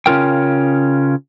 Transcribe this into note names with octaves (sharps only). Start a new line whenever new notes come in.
C#3 C#4 F4 A#4 G5